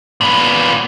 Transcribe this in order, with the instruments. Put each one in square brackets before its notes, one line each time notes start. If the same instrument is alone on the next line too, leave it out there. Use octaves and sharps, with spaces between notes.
[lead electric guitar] A#2 B3